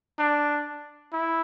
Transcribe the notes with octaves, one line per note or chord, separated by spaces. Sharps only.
D4
E4